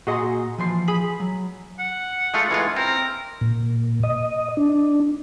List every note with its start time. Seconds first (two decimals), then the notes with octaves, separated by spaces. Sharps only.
0.07 A#2 F#4 G#4 D#5 F#5 C6
0.58 E3 F3 C6
0.88 G#4 B5
1.20 F#3
1.79 F#5
2.34 G#3 A3 F4
2.51 E3 G#3 F4
2.76 C4 A#4
3.41 A#2
4.03 D#5
4.57 D4